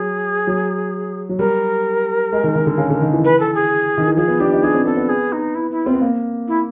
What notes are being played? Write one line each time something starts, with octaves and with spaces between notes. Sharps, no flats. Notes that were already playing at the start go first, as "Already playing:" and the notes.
Already playing: F#3 G#4
F#3
F#3
G3 A#4
G#3
D#3
D#3
D3
C#3
D3
D#3
E3
B4
A4
G#4
D#3
E3
F3 G#4
B3
D4 G4
D#4
D4 G#4
C4
B3 A4
B3
G#4
D#4
E4
E4
C4 F4
B3
A#3
E4